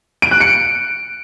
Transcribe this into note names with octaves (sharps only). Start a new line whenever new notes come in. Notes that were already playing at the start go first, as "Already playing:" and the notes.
D7
F#6
C#7